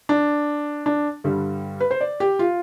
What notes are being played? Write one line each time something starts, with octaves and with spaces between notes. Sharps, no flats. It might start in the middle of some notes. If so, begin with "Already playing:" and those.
D4
D4
G2 D3 G3
B4
C5
D5
G4
F4